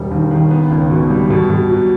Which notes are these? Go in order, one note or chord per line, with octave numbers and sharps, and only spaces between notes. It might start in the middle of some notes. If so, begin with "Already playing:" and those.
Already playing: E1 G3
D#2
D#3
B3
C#2
B2
G3
B2
B2
F#3